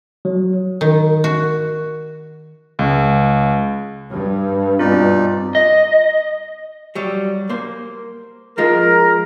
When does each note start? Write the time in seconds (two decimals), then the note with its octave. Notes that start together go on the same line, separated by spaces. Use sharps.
0.25 F#3
0.81 D#3
1.24 F#4
2.79 C#2
4.11 G2
4.79 B2 C4 D#4 F4 D5
5.55 D#5
6.95 F#3 G3
7.49 A#3 C5
8.58 F3 G#3 F4 A#4